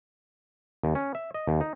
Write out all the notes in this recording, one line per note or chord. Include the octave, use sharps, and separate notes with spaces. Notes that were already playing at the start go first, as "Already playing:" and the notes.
D#2
C#4
E5
D#5
D#2
D#4